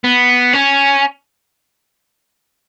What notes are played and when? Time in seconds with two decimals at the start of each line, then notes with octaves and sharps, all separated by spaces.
0.04 B3
0.53 C#4